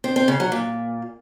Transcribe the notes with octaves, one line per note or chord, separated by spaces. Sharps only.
C4
C4
C#3
F#3
A#2